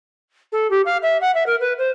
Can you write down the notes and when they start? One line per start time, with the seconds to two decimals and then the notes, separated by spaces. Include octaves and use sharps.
0.52 A4
0.70 G4
0.85 F5
1.02 E5
1.21 F#5
1.34 E5
1.46 A#4
1.60 B4
1.78 C5